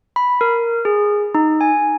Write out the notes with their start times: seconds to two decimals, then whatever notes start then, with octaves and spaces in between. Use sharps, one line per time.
0.16 B5
0.41 A#4
0.85 G#4
1.35 D#4
1.61 G#5